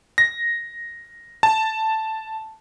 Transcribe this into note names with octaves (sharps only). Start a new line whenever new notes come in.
A#6
A5